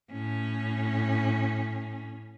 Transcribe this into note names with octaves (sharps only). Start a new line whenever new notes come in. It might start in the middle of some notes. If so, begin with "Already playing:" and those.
A2 C#4